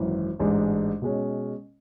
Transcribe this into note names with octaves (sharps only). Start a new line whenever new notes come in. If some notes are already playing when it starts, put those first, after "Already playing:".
Already playing: G#1 F#2 E3
A1 G#2 G#3 D4
B2 G#3 C#4